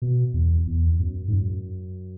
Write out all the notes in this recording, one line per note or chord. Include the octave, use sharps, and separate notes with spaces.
B2
E2
E2
F#2
G#2
F#2